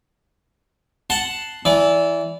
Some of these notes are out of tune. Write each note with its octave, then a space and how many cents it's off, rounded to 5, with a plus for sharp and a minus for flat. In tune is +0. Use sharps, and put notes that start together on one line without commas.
F#5 +0 A5 +0 C6 +0
E3 +0 D5 -25